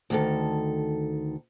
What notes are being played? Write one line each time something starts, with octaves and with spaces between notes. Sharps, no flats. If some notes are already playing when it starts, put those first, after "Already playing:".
D2 D#3 A4